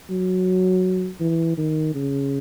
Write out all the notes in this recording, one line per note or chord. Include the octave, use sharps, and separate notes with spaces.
F#3
E3
D#3
C#3